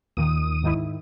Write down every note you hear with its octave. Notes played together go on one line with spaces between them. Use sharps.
D#2 A#2 D#3 D#6
G#2 D#3 E4